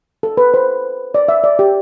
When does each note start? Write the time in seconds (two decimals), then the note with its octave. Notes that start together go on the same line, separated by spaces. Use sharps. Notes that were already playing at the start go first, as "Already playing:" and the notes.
0.23 A4
0.37 B4
0.54 C5
1.14 D5
1.28 E5
1.44 D5
1.59 G4